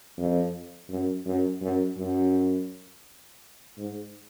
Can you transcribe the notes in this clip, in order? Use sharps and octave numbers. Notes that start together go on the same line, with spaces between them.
F2
F#2
F#2
F#2
F#2
G#2